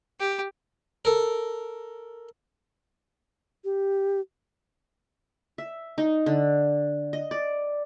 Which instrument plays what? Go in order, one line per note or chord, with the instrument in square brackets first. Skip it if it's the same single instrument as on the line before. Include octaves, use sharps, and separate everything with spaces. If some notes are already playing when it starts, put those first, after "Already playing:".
[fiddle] G4
[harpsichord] A4 A#4
[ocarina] G4
[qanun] E5
D#4
D3
D#5
D5